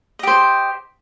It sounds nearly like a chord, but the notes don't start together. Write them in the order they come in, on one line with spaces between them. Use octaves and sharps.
D#5 G4 C5